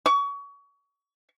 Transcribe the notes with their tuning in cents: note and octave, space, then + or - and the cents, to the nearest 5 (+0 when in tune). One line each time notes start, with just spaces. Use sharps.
C#6 +30